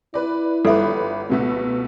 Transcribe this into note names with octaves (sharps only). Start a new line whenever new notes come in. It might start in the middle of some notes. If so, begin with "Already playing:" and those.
E4 B4 D5
G1 A4 B4 E5
C#2 B2 A3 B3